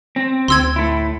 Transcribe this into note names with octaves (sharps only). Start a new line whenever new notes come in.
C4
D2 C6 E6 G#6
A2 A3 E4